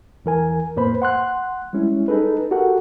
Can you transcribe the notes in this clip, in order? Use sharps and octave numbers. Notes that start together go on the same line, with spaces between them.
E2 E3 A#4 G#5
F2 A2 A#3 B4 C5 B5
F#5 C6 F#6
G3 G#3 C#4 E4
D#4 G#4 A4 B4
F#4 G4 A4 A#4 F#5